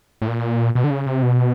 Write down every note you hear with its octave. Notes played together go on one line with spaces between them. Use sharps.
A2
A#2
B2
D3
C#3
C3
B2